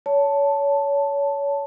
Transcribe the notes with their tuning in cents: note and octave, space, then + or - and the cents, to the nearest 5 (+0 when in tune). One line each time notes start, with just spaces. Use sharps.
C#5 +25 A5 +0